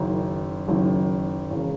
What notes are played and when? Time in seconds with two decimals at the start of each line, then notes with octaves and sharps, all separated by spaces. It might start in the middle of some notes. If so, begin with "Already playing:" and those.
Already playing: F#1 F#2 D#3
0.68 F#1 F#2 D#3
1.51 E1 E2 C#3